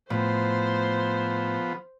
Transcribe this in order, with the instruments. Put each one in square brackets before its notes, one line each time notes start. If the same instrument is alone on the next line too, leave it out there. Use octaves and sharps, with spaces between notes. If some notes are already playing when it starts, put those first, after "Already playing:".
[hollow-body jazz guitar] A2 [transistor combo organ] F3 B3 [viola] C5